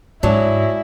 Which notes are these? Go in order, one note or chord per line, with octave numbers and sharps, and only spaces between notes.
G#2 F#3 D4 E4 F#4 G#4